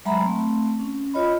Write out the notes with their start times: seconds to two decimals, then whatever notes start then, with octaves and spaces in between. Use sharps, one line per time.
0.05 F#3 G#3 E5 F#5 A#5 B5
0.21 A3 C4
0.80 C#4
1.14 F4 C#5 D#5 B5